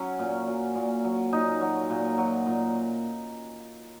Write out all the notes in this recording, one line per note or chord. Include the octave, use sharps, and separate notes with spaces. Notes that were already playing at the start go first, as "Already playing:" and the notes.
Already playing: F#3 C#4
A#2
F#3
A#2
F#3
A#2 D#4
F#3
A#2
F#3
A#2